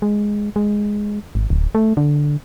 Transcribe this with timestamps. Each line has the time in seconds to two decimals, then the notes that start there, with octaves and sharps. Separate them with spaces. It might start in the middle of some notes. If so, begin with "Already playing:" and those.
0.02 G#3
0.56 G#3
1.35 G#1
1.50 D1
1.75 A3
1.97 D3